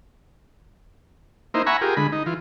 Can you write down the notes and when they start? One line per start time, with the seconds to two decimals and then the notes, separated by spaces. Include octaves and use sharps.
1.54 A#3 D#4 E4 C5
1.66 E5 F#5 G#5 A#5 B5 C#6
1.81 F4 G4 G#4 A#4
1.97 D3 G#3 B5
2.12 D#4
2.26 E3 F4